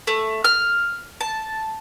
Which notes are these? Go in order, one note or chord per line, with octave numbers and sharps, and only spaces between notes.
A3
F6
A5